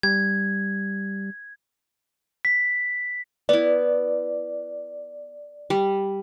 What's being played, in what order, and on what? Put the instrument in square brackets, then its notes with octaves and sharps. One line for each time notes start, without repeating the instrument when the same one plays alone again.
[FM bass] G3 [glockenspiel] G#6
[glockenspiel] B6
[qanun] B3 E4 [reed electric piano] D5
[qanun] G3